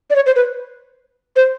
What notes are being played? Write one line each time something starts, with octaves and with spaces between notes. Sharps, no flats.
D5
C#5
C5
B4
C5